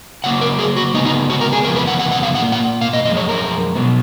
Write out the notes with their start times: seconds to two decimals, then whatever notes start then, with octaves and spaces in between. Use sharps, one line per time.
0.24 C#3 F#3 A#3 F#5
0.41 A#4
0.59 G#4
0.77 F#4
0.94 C#3 G#3 B3 D#4
1.06 D#4
1.30 F#4
1.41 A#4
1.53 G#4
1.64 F2 C#3 F3 B3 A#4
1.76 B4
1.87 F#5
1.99 F#5
2.11 F#5
2.23 F5
2.35 A#2 F3 A#3 F#5
2.52 F#5
2.81 F5
2.93 D#5
3.05 F#2 F3 G#3 D#5
3.17 C#5
3.29 A#4
3.75 B2 F#3 B3